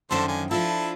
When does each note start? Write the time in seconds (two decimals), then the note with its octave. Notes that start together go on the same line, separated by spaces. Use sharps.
0.11 F#2 D3 D#3 F3 A4 C5
0.28 D3 G#5
0.51 F3 D4 E4 F4 A4